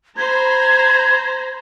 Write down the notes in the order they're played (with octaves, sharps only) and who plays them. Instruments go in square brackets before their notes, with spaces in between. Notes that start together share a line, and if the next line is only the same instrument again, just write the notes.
[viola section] C5 A#5 B5 [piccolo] G#6